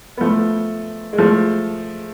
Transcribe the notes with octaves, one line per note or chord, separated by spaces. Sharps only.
B3
F3 A3
G#3
F3 A3